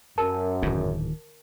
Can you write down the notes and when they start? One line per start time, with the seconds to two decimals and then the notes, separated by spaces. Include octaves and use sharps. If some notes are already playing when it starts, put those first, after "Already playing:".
0.18 F#2 A#4 A5
0.62 D1 G#2 D#3